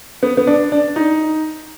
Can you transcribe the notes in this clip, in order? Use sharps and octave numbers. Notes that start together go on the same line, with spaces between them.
B3
B3
D4
D4
D#4